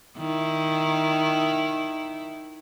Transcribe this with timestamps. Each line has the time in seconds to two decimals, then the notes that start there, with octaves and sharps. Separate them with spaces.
0.17 D#3 E4